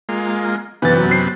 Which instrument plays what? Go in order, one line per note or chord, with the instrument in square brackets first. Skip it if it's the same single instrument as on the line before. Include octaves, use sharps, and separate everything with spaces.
[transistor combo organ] G#3 A#3 F4
[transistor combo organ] F#2 C3 B3 [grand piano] E3 A6
[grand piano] F#3
C7